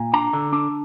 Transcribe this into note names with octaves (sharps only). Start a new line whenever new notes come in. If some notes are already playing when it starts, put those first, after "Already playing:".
Already playing: A#2
D4 A#5
D3
D4